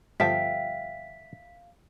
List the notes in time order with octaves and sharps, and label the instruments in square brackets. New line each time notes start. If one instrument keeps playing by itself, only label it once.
[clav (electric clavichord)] G1 F3 A5 [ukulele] E5 G5 [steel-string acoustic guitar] F5 [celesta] B6